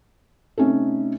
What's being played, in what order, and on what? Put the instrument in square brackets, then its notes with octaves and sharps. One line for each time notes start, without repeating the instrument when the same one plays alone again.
[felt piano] C3 A3 C#4 D#4 A4